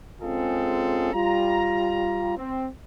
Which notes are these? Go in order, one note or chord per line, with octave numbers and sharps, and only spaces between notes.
G#3 C4 C#4 F4 G#4 A4
G3 F4 A#5
C4